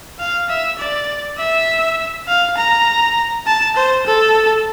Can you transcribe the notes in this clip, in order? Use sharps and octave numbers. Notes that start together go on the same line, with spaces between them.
F5
E5
D5
E5
F5
A#5
A5
C5
A4